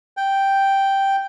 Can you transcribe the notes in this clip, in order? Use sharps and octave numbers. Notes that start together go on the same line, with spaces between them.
G5